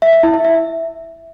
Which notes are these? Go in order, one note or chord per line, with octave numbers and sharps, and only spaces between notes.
E5
E5
E4
E5
E5